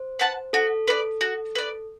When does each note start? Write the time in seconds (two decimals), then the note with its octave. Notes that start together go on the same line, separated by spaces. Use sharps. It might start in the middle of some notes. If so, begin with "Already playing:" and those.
Already playing: C5
0.19 B4 F#5 A5
0.53 F#4 A4
0.88 B4 D5
1.21 F#4
1.55 B4 D5